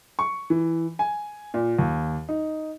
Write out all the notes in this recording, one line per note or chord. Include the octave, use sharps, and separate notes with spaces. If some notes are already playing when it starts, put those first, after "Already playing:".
C#6
E3
G#5
A#2
D#2
D#4